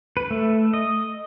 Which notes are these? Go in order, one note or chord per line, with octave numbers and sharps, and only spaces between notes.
B4
A3
D#5